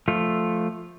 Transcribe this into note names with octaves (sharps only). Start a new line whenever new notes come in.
F3 A3 F4